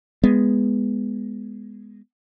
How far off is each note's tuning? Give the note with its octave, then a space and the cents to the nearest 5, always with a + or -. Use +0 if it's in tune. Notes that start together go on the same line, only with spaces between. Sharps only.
G#3 -5 B3 +0